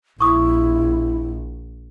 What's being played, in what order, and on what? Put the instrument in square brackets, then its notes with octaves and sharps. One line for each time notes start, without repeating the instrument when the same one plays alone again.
[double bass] A#1 [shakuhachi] E4 [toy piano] C#6 D#6